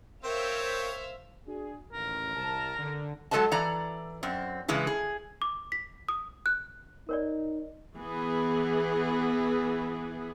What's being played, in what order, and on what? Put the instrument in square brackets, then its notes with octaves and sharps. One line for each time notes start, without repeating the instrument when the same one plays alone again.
[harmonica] C4 C#5 G5 [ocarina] A#4 [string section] C5 E5 F5
[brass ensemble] D4 F#4 G#4
[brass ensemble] A1 D#2 [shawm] A#4
[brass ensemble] C2 A5
D3
[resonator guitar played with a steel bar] F#3 G#3 A4 B4 D#5 A5
E3 D5 A#5
F#2 C4
C#3 E3 G#3 E4
G#4
[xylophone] D6
B6
D#6
F#6
[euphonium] D#4 [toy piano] A#4 C#5 D5
[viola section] E3 B3 G#4